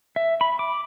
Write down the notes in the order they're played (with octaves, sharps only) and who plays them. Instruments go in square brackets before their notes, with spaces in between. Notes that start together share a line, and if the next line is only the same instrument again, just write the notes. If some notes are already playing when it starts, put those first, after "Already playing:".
[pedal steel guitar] E5
B5
D6